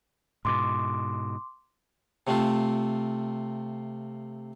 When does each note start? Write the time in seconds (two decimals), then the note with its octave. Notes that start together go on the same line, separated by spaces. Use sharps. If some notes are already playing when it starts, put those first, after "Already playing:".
0.45 G#2 B2 C6 D6
2.27 C3 A3 C4 F4